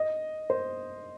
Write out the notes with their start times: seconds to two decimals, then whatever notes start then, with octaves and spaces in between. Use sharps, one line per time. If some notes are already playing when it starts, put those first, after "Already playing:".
Already playing: D#5
0.50 C5